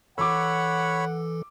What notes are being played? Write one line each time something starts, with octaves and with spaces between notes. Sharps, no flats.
E3 A4 C#5 F#5 B5 D6 E6